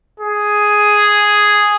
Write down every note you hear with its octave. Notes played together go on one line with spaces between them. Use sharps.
G#4